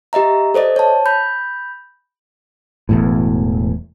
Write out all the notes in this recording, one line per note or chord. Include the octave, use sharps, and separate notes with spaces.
G4 D#5 E5 A#5
A4 C5 D5 D#5
C#5 A5
B5 G6
E1 E2 A2